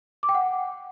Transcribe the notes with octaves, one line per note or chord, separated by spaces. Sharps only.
D6
G5
F#5